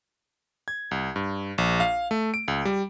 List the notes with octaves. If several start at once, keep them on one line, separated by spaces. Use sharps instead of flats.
G#6
C2
G2
A#1
F5
A3
D7
C#2
G3